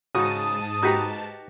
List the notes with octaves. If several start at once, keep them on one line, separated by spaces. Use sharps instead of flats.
G#2 C#3 D#4 F#4 A5 D#6
D#4 F#4 G4 B4 A#5